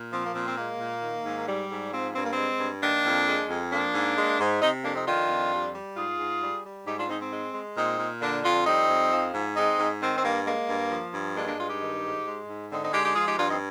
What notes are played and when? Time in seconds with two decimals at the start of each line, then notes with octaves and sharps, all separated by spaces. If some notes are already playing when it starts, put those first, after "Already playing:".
Already playing: A#2
0.12 F3 C4
0.24 A#3
0.35 A#2 C4
0.46 C4
0.57 G#3 A#3
0.80 A#2
1.03 D#3
1.25 G#2
1.47 G3
1.70 G#2
1.92 F3 C4
2.15 G2 C4
2.24 A#3
2.33 G#3 C4
2.60 G2
2.82 D#3 A#3 D4
3.04 F2
3.27 G#3
3.49 F2
3.72 F3 A#3 D4
3.94 G#2
4.17 G#3
4.40 G#2
4.62 C3 C4 D#4
4.84 F2 A#3 D4
4.95 C4 D#4
5.07 D#3 D4 F4
5.29 F2
5.52 G3
5.74 G3
5.96 G#2 F4 G#4
6.19 G#2
6.41 G3
6.64 G3
6.87 G#2 D#4 G4
6.97 D4 F4
7.09 G#2 C4 D#4
7.20 C4
7.32 G#3
7.54 G#3
7.76 A#2 C4 D#4
7.99 A#2
8.21 D3 A#3 D4
8.44 F2 D4 F4
8.66 G3 C4 D#4
8.89 F2
9.12 F3
9.34 G#2
9.56 G#3 C4 D#4
9.79 G#2
10.01 D#3 C4
10.17 C4
10.24 G2 A#3
10.46 G#3 A#3
10.68 G2
10.91 F3
11.13 G2
11.36 G#3 A#3 D4
11.47 A#3 D4
11.58 G2 D4 F4
11.70 D#4 G4
11.80 D#3
12.03 G#2
12.26 G#3
12.48 G#2
12.71 D3 C4 D#4
12.82 C4 D#4
12.93 G#3 D#4 G4
13.04 D#4 G4
13.15 F3 F4 G#4
13.27 D#4 G4
13.38 G2 D4 F4
13.50 C4 D#4